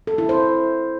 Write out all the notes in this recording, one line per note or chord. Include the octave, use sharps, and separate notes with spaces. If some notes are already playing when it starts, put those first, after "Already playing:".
A4
E4
C5